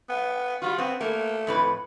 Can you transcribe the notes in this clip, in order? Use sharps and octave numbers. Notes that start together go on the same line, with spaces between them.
B3
G3 F4 F#4
B3 C4
A3 A#3 A#4
F2 A2 B4